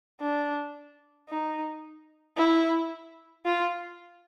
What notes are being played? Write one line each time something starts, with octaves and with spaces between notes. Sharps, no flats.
D4
D#4
E4
F4